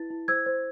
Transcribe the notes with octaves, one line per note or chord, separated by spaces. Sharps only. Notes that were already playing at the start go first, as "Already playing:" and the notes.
Already playing: E4 B4 A6
E4
C5 E6 G#6
C5